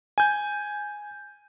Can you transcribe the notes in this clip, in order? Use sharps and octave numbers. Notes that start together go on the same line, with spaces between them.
G#5 G6